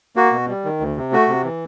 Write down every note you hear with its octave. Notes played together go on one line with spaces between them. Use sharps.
A#3 F#4
B2
G3
D#3
D2
C3
A3 F#4
C3
E3